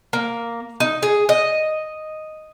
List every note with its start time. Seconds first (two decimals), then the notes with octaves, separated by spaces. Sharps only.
0.13 A#3
0.80 D#4
1.03 G#4
1.29 D#5